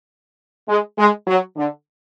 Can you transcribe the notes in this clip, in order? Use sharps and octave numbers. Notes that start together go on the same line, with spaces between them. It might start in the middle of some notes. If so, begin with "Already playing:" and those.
G#3
G#3
F#3
D3